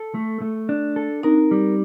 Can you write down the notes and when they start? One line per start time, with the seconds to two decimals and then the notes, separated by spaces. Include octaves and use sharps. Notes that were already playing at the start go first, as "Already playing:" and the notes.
Already playing: A4
0.15 A3
0.42 A3
0.69 D4
0.96 A4
1.23 C4 D#4 A#4
1.51 G3